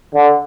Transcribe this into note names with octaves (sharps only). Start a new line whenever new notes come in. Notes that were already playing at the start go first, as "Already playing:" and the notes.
D3